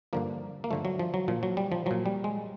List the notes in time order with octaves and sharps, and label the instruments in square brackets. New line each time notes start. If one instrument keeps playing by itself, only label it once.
[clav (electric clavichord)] G2 D3 F3 A#3
A#3
G2 D3 F3 A3
F#3
F3
F#3
A#2 F3
F#3
G3
F3
A#2 F3 F#3
G3
G#3